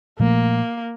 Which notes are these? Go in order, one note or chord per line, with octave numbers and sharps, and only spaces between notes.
A#2 F3 A3 A#3